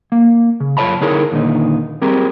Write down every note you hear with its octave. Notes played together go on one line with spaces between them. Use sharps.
A#3
C#3
F#2 F4 C#5 D#5 A5 B5
D3 D#4 E4 G#4 A#4 C#5
D#2 A#2 D3 D#4
G3 C4 G4 G#4 A#4